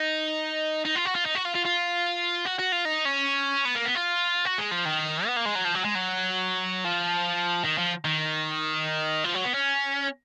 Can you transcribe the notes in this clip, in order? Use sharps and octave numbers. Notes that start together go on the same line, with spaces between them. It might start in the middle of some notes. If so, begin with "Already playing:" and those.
Already playing: D#4
D#4
F4
F#4
F4
D#4
F#4
F4
F4
F4
F#4
F#4
F4
D#4
C#4
B3
A#3
B3
F4
F#4
G#3
F3
D#3
B3
A#3
G#3
F#3
F3
F#3
G#3
F#3
F3
D#3
F3
D#3
F3
F#3
B3
C#4